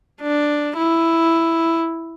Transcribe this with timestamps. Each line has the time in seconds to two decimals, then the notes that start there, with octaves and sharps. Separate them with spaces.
0.22 D4
0.77 E4